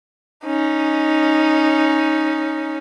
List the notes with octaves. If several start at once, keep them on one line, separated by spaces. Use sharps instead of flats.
C#4 D#4